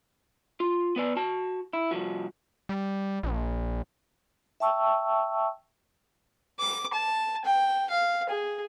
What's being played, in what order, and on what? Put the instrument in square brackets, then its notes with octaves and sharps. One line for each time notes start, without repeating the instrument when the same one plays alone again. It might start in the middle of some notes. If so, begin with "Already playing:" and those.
[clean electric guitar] F4
B3 B4 D5
F#4 A5
E4
C2 F3 F#4
[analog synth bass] G3
A#1
[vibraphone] E5 G5 A5 C#6 E6
[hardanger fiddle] D6
A5
G5
F5
G#4